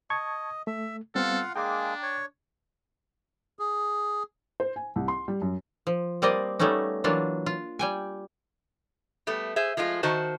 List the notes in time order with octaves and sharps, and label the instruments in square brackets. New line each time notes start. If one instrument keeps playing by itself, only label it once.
[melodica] D#5 [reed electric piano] A5 C#6 G#6
[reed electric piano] A3 [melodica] E5
[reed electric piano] G3 B3 C4 [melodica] F4 F5 F#5 [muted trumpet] A4
[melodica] G#3 A#3 G#4 [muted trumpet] D4 [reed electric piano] G5 A#5 D6
[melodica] C#5
[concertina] G#4
[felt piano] C5
G#5
C2
C6
G3
F#2
[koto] F3
G3 A#3 C4 D5 D#5
G3 A3 B3 C#4 D#4
E3 F#3 A#3 D4 F4
F4
G3 G5 G#5
[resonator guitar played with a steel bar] G3 A3 B3
G#4 C5 E5
F3 G#3 A3 F4
D#3 F#4 C5 A5